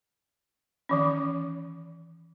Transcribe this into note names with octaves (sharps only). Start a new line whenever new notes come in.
D#3 E3 C#4